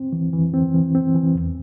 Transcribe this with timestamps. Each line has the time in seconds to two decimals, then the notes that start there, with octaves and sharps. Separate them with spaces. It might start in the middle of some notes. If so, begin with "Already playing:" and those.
Already playing: C4
0.12 E3
0.33 E3
0.54 C4
0.74 E3
0.95 C4
1.15 E3
1.35 E2